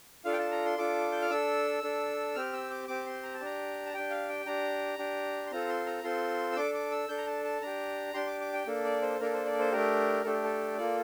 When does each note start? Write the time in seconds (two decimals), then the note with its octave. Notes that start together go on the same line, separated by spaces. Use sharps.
0.25 D4 F4 A4 F5
0.33 G5
0.39 A5
0.51 A#5
0.65 C6
0.78 D4 F4 A4 D6
1.12 G6
1.22 F6
1.30 D4 A4 E6
1.83 D4 A4
2.35 C4 G4 F6
2.53 E6
2.70 D6
2.88 C4 G4 D6
3.06 C6
3.23 A#5
3.34 A5
3.40 D4 G4 A#5
3.86 A5
3.94 D4 G4 G5
4.10 F5
4.29 G5
4.46 D4 G4 A#5
4.99 D4 G4
5.46 C6
5.51 C4 F4 A4 A#5
5.69 C6
5.86 A#5
6.03 C4 F4 A4 C6
6.52 E6
6.56 D4 A4 D6
6.74 D6
6.91 E6
7.09 D4 A4 G6
7.18 A#5
7.27 A5
7.45 A5
7.62 D4 G4 A#5
8.14 D4 G4 C6
8.27 D6
8.41 D6
8.53 G5
8.67 A#3 D4 A4
8.85 D5
9.02 C5
9.20 A#3 D4 A4 A#4
9.33 C5
9.46 D5
9.59 C5
9.72 A3 D4 G4 A#4
10.24 A3 D4 G4 A4
10.44 A4
10.77 A#3 F4 A4 D5